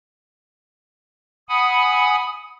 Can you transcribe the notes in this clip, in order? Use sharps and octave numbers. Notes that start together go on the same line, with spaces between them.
F#5 G#5 B5 D#6